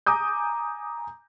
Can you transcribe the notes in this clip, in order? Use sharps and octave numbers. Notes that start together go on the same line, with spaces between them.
G#5 A#5 D6 D#6 G6